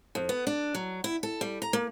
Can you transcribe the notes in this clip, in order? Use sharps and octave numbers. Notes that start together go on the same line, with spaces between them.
F2
B3
D4
F#3
E4
A4
G3
A#5
A#3